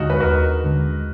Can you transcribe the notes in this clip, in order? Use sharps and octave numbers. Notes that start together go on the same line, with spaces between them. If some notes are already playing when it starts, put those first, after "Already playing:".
Already playing: D#2 D3 G#3 D#4 F4 F#4 G#4
B4
D#2 F#4 A#4
D3 G#3